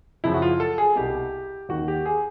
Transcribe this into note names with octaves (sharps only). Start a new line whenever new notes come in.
F#2 C#3 F3 E4
F#4
F4
A4
G#4
C2 B2 G4
D#2 D#3 F#4
G4
G#4